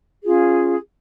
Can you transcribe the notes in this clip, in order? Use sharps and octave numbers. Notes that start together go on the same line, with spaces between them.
C#4 F4 G#4